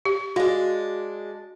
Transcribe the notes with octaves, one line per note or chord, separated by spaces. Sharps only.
G4
G#3 D4 F#4 F5